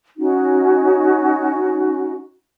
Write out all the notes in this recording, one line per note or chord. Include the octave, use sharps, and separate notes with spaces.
C#4 D#4 F#4